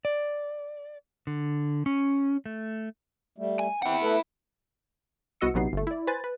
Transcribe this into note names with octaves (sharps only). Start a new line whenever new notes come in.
D5
D3
C#4
A3
G3 A3
G#5
C4 E4 F#5 G5
A3 A4 B4
C2 B3 F#4 D#5 E6 C#7
A#1 C3 F#3 B3 D#4 C7
G1 A3
E4 D5
B4 C5 G#5 A6
B4